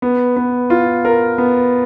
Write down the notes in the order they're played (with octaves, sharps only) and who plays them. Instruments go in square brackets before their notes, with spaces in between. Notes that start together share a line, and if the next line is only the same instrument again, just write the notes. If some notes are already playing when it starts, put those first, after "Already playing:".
[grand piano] B3
B3
F4
A#4
B3